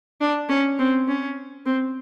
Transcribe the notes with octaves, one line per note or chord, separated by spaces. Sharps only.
D4
C#4
C4
C#4
C4